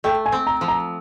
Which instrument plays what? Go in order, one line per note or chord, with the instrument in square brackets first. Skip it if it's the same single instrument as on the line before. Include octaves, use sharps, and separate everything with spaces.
[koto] A3 [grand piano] G5
[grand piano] G#5
[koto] C4
[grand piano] A#5
[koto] F3
[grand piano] A#5